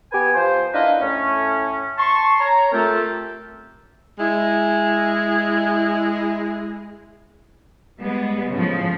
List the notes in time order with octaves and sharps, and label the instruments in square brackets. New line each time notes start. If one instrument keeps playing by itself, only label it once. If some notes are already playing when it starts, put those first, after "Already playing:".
[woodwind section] B3 G4 B4 G#5
F3 C5
D4 E4 F4 A#4 B4 D#5
A2 C#4
A5 C6 C#6
C#5 A#5
A3 C4 F4 G4 A4 A#4
[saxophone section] G#3 E4
[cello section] G3 G#3 B3
A2 C#3 F3